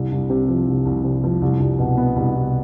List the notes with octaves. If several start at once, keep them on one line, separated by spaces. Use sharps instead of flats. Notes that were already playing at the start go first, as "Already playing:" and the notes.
Already playing: C2
C2
C3
F3
C2
C2
C3
F3
C2
C2
B2
B3
C2
C2